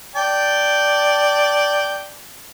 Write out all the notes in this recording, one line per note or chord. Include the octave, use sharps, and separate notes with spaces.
D5 G5 A5